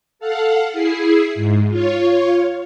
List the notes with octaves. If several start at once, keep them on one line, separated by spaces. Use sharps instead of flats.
A4 F5 F#5
E4 G#4 C7
G#2
F4 C#5